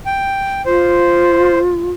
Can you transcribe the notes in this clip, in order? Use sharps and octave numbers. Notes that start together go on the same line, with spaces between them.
G5
F4 C5